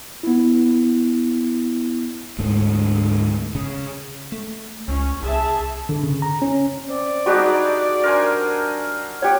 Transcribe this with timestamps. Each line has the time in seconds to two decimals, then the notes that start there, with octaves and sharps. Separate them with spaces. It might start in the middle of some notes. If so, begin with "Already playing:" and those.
0.23 B3 E4
2.39 D2 G#2 A3
3.55 C#3
4.32 A3
4.88 C#2 C#4
5.23 C2 G#4 E5 A5
5.89 D3
6.03 C#3
6.22 A#5
6.42 C#4
6.88 C4 D5
7.26 G3 D4 D#4 F#4 G#4
8.03 D4 A#4 C5 G#5
9.22 G4 C#5 F#5